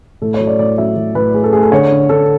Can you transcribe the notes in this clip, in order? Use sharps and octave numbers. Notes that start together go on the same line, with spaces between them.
A2 A4
C#5
F#3
D5
A2 D5
F#3 E5
F#3
A2 B4
A3 G#4
A4
A3 G#4
A4
D3 C#5
D3
D3 A4